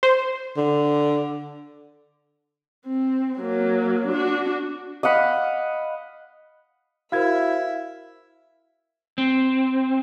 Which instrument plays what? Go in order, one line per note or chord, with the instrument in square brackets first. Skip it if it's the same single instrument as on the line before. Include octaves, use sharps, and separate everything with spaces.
[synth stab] C5
[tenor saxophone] D3
[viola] C4
F#3 A#3
D4 F#4
[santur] D#5 F5 F#5 B5
[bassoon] E4 [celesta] F#4 A#4 C5 [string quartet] E5 [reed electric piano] F5 G#6
[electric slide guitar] C4